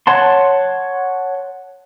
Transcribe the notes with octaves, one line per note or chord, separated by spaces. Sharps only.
C#5 F#5 A5 C6